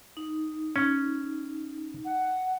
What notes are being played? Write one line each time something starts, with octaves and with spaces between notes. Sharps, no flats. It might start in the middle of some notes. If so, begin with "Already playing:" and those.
D#4
C#4
F#5